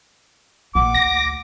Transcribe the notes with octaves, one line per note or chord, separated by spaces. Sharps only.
A#1 A#3 F#5 D6
D2 A#6